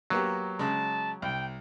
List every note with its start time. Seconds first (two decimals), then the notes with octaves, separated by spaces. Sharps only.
0.10 F#3 A#3 B3 G4
0.59 C#3 G#3 A5
1.22 C2 G5